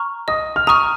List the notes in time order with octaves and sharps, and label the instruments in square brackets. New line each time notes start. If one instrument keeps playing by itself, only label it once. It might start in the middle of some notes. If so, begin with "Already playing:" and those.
Already playing: [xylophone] A#5 C#6 F6
[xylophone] D#5 [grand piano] D#6
[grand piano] F6
[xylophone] A#5 C#6 F6 [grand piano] D#6